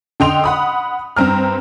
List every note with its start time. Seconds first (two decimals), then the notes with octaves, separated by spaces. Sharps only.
0.20 D3 D#5 G5 C6 F7
0.44 F#5 B5 D#6
1.17 G2 C4 A#5 F6